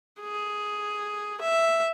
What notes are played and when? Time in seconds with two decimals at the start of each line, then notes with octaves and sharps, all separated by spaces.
0.21 G#4
1.41 E5